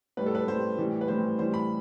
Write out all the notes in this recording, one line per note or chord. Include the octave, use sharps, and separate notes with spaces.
A2 G3 B4
A4
B4
A2 G3 C5
A2 E3 G3
B4
A2 E3 G3 C5
A2 E3 G3 C5
B5